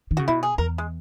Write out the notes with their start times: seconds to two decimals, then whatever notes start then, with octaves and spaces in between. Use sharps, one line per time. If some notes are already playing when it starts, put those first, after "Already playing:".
0.11 D#3
0.17 C#3 F#4
0.28 B2 E4
0.43 G#4
0.58 E2 A#4
0.78 G#3